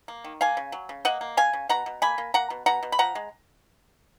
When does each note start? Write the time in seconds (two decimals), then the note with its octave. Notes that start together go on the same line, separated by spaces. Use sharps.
0.08 A#3
0.24 D#3
0.41 A#3 F5 G#5
0.57 C#3
0.72 F#3
0.89 C#3
1.05 A#3 D#5 F#5
1.21 A#3
1.37 C#3 F5 G#5
1.53 C#3
1.69 B2 F#5 A#5
1.86 B2
2.02 A#3 G#5 B5
2.18 A#3
2.34 A#3 F#5 A#5
2.50 B2
2.66 B2 F#5 A#5
2.83 B2
2.92 B5
2.99 F3 F#5 A#5
3.15 G#3